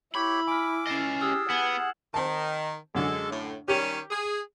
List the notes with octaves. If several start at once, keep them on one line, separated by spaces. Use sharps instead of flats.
E4 G4 C#5 B5
G#5 D6 F6
C#4 D#5 A6 C7 E7
G4 G#4 E6 F6
B3 F#5 G#6 E7 F#7
D#3 C4 A5
F#2 D3 G#3 A4
A2
D#3 G3 C#4 G4
G#4